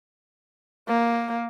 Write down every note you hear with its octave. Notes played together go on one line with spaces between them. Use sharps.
A#3